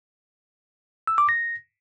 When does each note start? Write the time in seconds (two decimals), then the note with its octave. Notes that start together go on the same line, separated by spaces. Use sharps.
1.07 E6
1.18 D6
1.29 A#6